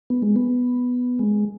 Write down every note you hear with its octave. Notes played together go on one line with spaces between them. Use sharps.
B3
G#3
B3
G#3